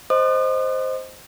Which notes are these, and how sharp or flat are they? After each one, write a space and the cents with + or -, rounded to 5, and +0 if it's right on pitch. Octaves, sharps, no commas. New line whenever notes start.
C5 +0 D#5 +0 D#6 -45